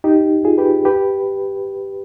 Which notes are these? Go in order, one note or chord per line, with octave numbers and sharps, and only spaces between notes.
D#4 G4
F4 G#4
G4 B4
G4 B4